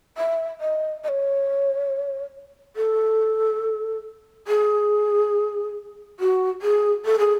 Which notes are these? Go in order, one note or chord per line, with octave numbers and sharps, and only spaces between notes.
E5
D#5
D#5
C#5
A4
G#4
F#4
G#4
A4
G#4